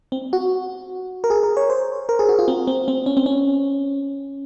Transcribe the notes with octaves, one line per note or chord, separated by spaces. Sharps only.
C4
F#4
A#4
G#4
A#4
C#5
C5
A#4
G#4
F#4
F4
C4
C4
C4
C#4
C4
C#4